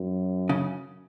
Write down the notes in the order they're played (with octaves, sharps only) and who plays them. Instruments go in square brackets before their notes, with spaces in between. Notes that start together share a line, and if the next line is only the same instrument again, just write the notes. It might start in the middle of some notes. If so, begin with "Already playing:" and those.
Already playing: [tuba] F#2
[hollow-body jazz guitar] C#3